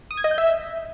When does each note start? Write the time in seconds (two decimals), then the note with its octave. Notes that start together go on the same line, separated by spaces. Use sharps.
0.11 D#6
0.17 G#6
0.24 D#5
0.31 G6
0.38 E5